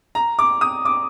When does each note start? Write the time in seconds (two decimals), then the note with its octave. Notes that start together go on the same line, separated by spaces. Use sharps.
0.15 A#5
0.39 D6
0.61 D#6
0.85 D6